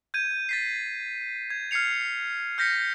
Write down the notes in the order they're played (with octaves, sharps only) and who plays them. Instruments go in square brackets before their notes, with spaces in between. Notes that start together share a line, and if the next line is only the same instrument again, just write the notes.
[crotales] G6 G#6 D#7
A6 B6 C7
G#6
F6 G#6 C7 C#7 F7
F6 G6 A#6 B6 C#7